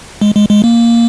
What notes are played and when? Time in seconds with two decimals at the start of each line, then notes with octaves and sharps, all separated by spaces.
0.21 G#3
0.36 G#3
0.49 G#3
0.64 A#3